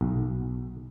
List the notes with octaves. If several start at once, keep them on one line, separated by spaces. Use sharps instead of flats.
B1